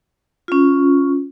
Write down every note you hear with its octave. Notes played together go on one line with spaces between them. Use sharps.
C#4 F4